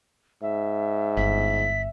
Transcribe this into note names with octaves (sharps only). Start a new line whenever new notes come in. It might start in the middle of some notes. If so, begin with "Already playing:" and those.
G#2 E5
G1 B6